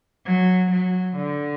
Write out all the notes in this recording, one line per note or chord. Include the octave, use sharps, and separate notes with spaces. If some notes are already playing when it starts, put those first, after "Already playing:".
F#3
F#3
D3